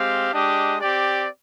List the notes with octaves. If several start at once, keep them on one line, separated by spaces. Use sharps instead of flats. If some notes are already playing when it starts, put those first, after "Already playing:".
Already playing: G#3 C4 G4 F5
G#3 D4 G4 D#5
C4 G4 D5